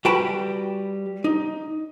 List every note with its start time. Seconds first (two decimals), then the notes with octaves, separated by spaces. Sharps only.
0.05 G3 F#4 B4 G5 A5 B5
1.24 D#4